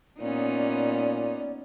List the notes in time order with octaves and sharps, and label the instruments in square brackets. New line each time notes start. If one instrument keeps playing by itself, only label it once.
[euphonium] A#2 [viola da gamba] B3 C#4 D#4 [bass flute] D5